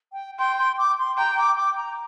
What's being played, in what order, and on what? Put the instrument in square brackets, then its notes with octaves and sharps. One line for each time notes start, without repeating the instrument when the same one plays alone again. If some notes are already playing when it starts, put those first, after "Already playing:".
[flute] G5
[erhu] G5 [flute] C6
[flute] C6
D6
C6
[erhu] G5 [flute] A#5
[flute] D6
D6
A#5